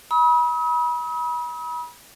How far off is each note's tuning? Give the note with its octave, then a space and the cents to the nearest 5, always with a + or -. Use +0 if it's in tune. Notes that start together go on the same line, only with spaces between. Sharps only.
B5 -35 D#6 +45